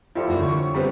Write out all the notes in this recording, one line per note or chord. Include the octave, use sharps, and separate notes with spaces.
F3 G3 E4 A4
A#3 F#4 C5
D3 C#5 C#6
G3 B3 C4